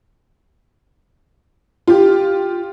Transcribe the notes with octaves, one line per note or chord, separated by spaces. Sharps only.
F4 G4